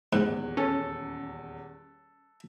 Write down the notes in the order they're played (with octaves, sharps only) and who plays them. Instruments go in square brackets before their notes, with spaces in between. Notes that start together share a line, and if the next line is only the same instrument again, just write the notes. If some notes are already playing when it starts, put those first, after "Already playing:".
[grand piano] D#1 E2 F#6 [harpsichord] G#2
[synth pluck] C#4 [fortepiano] A4